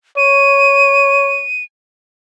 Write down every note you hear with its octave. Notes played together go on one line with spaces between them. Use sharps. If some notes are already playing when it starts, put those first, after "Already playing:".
C#5 D#7